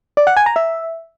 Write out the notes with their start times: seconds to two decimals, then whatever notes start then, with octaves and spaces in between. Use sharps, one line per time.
0.17 D5
0.27 F#5
0.37 G#5
0.46 A#5
0.56 E5